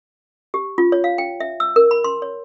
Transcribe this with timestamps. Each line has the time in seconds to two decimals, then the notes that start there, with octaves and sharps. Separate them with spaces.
0.54 G4
0.78 F4
0.92 C#5
1.04 F5
1.18 G5
1.40 E5
1.60 E6
1.76 A#4
1.91 B5
2.04 C6
2.22 C#5